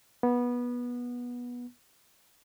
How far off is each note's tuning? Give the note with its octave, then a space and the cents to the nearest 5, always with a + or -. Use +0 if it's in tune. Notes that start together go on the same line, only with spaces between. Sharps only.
B3 -20